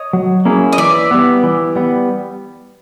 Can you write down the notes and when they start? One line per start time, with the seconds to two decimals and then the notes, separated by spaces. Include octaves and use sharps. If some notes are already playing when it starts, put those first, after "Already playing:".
Already playing: C#5 D#5
0.13 F#3
0.45 A#3 C#4 E4 G#4
0.73 D#5
0.78 E3 D5 E5
1.11 G3 B3
1.43 E3
1.75 G3 B3